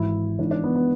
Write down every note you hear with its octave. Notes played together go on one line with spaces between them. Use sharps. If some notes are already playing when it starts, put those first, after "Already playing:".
Already playing: G#1 G#2 E3 E4
G#1 G#2 E3 D4
D4
B3
B3